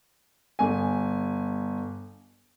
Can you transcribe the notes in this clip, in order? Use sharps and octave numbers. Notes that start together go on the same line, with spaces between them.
G1 G#5